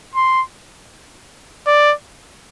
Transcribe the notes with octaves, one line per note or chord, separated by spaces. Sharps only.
C6
D5